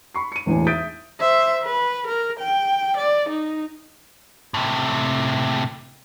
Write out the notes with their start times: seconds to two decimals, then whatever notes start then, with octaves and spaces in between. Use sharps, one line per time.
0.15 B5 C#6 C7
0.32 C#7 D#7
0.46 E1 E2 A2 D4 G#5
0.67 E5 D#6 G6 A6 B6 D7
1.20 C5 E5
1.63 B4
2.07 A#4
2.39 G5
2.97 D5
3.29 D#4
4.54 A2 C3